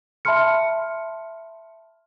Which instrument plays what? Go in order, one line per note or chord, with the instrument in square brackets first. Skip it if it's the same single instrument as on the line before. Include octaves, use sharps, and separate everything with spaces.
[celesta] E5 A5 B5 C6 F6 C#7